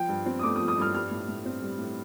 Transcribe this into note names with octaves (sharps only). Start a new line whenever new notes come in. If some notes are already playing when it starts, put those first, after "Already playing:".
Already playing: F3 G5
G2
C4
D#6
A3 D6
D#6
F3
D#6
G2 F6
G3 F6
A2
A2
C4
G3
A2